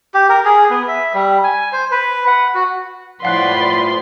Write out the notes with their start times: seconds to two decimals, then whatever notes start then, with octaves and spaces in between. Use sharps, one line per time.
0.14 G4
0.29 A#4
0.45 G#4
0.70 B3
0.88 E5
1.14 G3
1.44 G#5
1.72 C5
1.91 B4
2.27 F#5
2.54 F#4
3.23 A2 F3 B4 D5 F5 F#5 C6 F#6